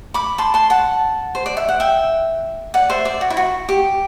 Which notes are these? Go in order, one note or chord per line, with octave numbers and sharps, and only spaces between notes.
B5 D6
A5 C6
A5 C6
F#5 A5
C5
D5
E5
F#5
E5 G5
D5 F#5
C5 E5
D5
F#4
E4
F#4
G4